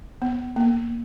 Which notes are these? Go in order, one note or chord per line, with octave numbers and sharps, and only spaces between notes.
B3
A#3